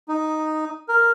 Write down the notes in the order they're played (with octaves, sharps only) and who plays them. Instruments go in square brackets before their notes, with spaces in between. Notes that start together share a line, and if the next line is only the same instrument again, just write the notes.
[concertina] D#4
A#4